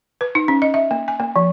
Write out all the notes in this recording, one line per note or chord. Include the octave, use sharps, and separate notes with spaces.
B4
D#4
C#4
D#5
E5
A#3
G#5
A#3
F3